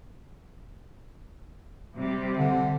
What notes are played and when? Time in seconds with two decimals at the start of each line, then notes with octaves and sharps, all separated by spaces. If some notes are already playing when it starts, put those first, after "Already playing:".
1.96 C3 G3
2.37 D3